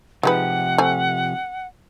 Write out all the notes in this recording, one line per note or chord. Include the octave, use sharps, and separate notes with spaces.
C3 F3 G#3 D#4 G4 B4 F#5
A3 C4 G#5